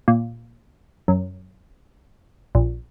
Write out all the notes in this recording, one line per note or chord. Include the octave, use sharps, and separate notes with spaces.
A#2
F#2
A#1